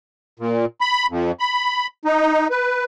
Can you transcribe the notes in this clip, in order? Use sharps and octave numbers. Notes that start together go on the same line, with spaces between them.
A#2
B5
F2
B5
D#4
B4